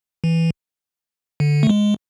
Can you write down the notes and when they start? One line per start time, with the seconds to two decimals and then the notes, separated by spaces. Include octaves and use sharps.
0.24 E3
1.40 D3
1.63 A3
1.69 G#3